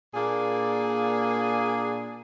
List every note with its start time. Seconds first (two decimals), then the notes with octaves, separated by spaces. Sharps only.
0.15 A#2 A#3 D4 G#4